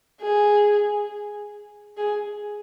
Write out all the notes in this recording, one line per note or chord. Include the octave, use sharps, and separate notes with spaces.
G#4
G#4